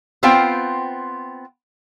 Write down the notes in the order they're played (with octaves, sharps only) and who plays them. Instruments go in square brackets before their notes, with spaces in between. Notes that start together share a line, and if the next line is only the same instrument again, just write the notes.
[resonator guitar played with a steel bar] B3 C4 F4 C5 F5 G5